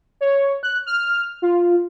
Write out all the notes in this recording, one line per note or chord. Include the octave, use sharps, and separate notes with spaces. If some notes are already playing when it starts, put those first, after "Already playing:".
C#5
F#6
F6
F4